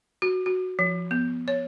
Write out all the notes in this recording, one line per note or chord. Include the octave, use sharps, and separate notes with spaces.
F#4
F#4
F3
B3
C#5